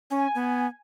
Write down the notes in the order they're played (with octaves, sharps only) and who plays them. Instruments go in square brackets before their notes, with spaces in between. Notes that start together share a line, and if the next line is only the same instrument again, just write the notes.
[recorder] C#4 [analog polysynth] G#5
[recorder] B3